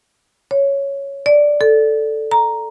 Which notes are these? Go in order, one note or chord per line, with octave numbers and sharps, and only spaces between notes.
C#5
D5
A4
A#5